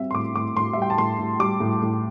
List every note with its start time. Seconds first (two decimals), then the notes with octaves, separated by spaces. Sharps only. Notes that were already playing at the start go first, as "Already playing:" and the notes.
Already playing: G3 C4 E5
0.11 C6
0.14 A2 D6
0.35 A2 D6
0.56 A2 C6
0.73 E5
0.77 G3 G5
0.90 A5
0.98 A2 C6
1.19 A2
1.39 G3 D6
1.60 A2
1.82 A2